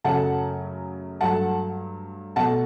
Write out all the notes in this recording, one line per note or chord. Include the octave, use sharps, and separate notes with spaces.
F#2 C#3 F#3 A3 F#5 A5
G2 F#3 A3 F#5 A5
B2 A3 F#5 A5